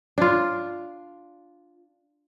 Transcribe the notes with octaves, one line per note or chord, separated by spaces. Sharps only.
D4 F4